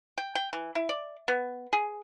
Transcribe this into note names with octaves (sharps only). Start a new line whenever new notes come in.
G5
G5
E3
E4
D5
B3
G#4